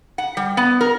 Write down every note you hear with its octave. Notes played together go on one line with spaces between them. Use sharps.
F#5
G3
B3
A#4